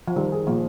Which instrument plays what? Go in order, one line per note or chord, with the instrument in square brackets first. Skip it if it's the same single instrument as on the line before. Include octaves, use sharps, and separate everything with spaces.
[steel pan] F3
[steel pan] D#3 [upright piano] G3
[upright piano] G#4
[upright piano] A#2 [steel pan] F3